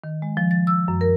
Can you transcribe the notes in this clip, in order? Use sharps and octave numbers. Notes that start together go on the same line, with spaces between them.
D#3
G#3
F3
A6
E6
F#2
A#4